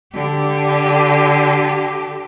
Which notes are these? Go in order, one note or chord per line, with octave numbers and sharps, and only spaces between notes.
D3 G4